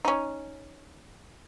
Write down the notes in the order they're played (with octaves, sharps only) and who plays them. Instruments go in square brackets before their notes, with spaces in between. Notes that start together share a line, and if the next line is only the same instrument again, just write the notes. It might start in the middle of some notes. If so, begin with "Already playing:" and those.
[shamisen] C#4 D#4